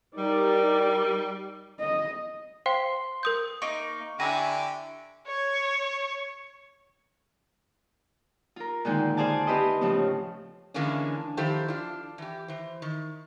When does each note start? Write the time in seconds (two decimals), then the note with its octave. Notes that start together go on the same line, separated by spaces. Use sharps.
0.18 G3 D#4 G4 A#4 D5
1.80 D#5
2.66 C5 F5 G5 C6
3.23 A#4 D#6 G6
3.62 A#3 D#4 C#6
4.20 D3 E4 G4 G#5 A#5
5.27 C#5
8.56 F4 A#4
8.85 A#2 D3 D#3 G#3 D#4
9.17 G#4 C5 D5 F5 G#5 A5
9.47 C4 E4 G4 B4 C5 D#5
9.81 A2 C#3 F3 C4 C#4
10.74 D3 E3 G#3 A#3 C#4 D4
11.37 D#3 F3 E4 G4 A4 C5
11.68 D4 F4
12.18 E3 G4
12.48 E3 C5
12.82 D#3